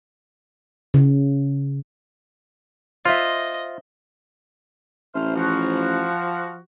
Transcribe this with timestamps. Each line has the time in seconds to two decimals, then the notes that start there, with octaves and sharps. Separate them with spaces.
0.94 C#3
3.05 F4 C5 D#5 E5
5.15 A1 A3 C5 F6
5.36 F3 F#4